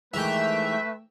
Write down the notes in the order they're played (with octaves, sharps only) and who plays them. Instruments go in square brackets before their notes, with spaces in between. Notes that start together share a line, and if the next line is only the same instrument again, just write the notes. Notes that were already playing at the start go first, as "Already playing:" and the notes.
[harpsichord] G#2 D#3 E3 [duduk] A3 [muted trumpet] B4 [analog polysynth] E5 G5